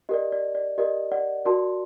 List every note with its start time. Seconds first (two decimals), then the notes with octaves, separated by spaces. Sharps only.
0.09 G4 A#4 D5 D#5
0.32 D5
0.55 D5
0.78 G4 A#4 D5 D#5
1.12 D5 F#5
1.45 F#4 A#4 D5 A5 C6